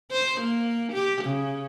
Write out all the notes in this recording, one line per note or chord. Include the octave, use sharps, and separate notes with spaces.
C5
A#3
G4
C#3